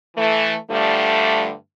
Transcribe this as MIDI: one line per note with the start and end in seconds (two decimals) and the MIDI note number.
0.17 0.55 52
0.17 0.55 57
0.70 1.53 43
0.70 1.53 50
0.70 1.53 53
0.70 1.53 55
0.70 1.53 57